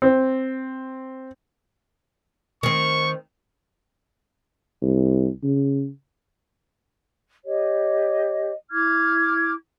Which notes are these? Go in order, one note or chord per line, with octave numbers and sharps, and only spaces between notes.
C4
D#3 C4 C#6
C2
C#3
G4 C#5 D#5
E4 D6 F6 G#6